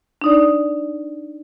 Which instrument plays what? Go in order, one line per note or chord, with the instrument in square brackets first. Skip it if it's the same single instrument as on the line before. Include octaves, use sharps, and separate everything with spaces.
[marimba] D4 D#4 D5